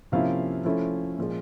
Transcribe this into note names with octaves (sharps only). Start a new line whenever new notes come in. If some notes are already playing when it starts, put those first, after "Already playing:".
C3 F3 A#3 C#4 E4 F5
F3 A3 C#4 E4
A#2 F3 G#3